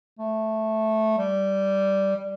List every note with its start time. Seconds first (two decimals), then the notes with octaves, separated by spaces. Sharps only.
0.19 A3
1.18 G3
2.16 G3